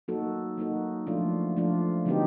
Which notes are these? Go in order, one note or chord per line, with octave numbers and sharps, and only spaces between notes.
F#3 A#3 D#4 F#4 A4
F#3 A#3 D#4 F#4 A4
F3 A3 D4 F4
F3 A3 D4 F4
D3 F#3 B3 D#4 G4